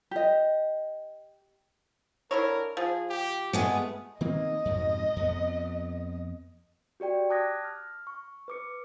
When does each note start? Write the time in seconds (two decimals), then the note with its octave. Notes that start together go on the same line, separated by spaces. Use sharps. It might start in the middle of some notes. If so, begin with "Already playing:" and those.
0.11 G4 D#5
2.31 D3 E4 A#4 C#5
2.77 F3 G#4
3.10 G4
3.53 G#3 A3 B3 G#4
4.21 D#3 A#3 C4 D#5
4.65 F2 G#2 B2
5.16 F2 B3
7.00 F#4 G4 D5 G5
7.30 A5 D6 D#6 F#6 G#6 A#6
7.65 F6
8.07 C#6
8.48 B4 D6 C#7